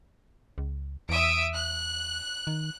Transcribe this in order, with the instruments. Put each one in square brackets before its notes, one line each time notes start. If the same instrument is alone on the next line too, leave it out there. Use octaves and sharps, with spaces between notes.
[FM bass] C#2
[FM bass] E2 [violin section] E5 D#6 D7
[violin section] F#6
[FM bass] D#3